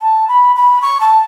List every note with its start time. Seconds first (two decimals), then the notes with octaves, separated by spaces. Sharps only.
0.02 A5
0.28 B5
0.56 B5
0.82 C#6
1.01 A5